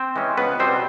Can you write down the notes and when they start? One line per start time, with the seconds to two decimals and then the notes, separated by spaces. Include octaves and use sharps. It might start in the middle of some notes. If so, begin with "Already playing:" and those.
Already playing: C4 C5
0.16 E3 G#3 C#4
0.37 C#2 B3 B4
0.60 B2 G3 C4 C5